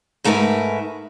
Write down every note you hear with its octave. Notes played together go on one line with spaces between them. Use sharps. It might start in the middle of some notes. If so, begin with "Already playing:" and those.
G#2 A3 A#4 B4 E5 G#5